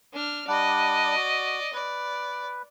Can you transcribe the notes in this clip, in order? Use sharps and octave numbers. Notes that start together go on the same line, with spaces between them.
D4 F6
G3 D4 D5 D#5 F#5
F#4
B4 D5